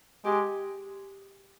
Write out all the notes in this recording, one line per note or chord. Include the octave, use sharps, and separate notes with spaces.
G#3 G4